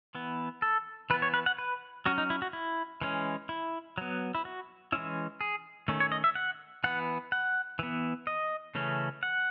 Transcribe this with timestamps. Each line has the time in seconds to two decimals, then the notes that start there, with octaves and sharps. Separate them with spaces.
0.15 E3 B3
0.62 A4
1.10 E3 B4
1.14 B3
1.22 C#5
1.34 B4
1.46 F#5
1.58 B4
2.06 F#3 C#4 F#4
2.18 D#4
2.30 E4
2.42 F#4
2.53 E4
3.01 E3 G#3 C#4
3.49 E4
3.98 F#3 B3
4.35 E4
4.45 F#4
4.92 E3 G#3 C#4 E4
5.41 G#4
5.88 D#3 A3 C#4
6.00 C#5
6.12 D#5
6.24 E5
6.35 F#5
6.84 E3 B3 F#5
7.32 F#5
7.79 E3 B3
8.27 D#5
8.75 C#3 E3 A3 C#4
9.23 F#5